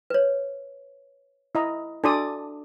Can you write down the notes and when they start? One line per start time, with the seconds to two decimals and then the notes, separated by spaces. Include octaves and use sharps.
0.10 B4 C#5
1.55 E4 D#5 A#5
2.04 D4 F#4 A4 D5 A5 D#6